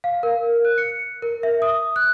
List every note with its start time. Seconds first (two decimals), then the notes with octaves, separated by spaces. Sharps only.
0.04 F5
0.23 A#4
0.65 F#6
0.78 C#7
1.22 A#4
1.43 E5
1.62 D#6
1.96 F#6